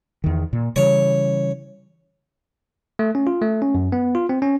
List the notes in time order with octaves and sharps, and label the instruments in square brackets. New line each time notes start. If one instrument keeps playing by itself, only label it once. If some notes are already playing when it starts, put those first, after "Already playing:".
[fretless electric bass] E2 D#3
A#2
[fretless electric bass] C#3 E3 G3 [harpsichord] C#5
[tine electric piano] A3
C#4
F4
A3
C#4
F#2
B3
F4
C4
C#4